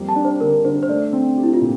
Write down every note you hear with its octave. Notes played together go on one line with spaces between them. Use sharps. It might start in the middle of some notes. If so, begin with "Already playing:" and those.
Already playing: F2 G3 A#3
A5
D4
C5
D3 A#4
D3 C5
C5
A3 D5
C4
G4
E4
F4
A#2